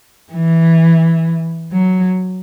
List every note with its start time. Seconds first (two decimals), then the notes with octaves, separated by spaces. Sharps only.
0.33 E3
1.71 F#3